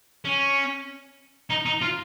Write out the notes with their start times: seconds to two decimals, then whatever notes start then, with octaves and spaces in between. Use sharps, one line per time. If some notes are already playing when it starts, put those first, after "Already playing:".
0.25 C#4
1.50 D#4
1.66 D#4
1.82 F4